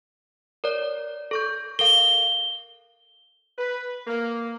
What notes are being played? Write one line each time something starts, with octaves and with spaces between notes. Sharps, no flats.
A#4 C#5 D5
A4 C#6 G6
A4 A#4 F5 G7
B4
A#3